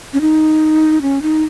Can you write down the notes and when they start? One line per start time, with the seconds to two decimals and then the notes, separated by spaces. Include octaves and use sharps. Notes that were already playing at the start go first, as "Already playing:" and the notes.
0.13 C#4
0.21 D#4
1.02 C#4
1.22 D#4